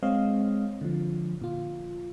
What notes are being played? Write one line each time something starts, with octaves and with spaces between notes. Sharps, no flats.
G#3 C4 C#5 D#5 F5
D3 F3
A#2 F4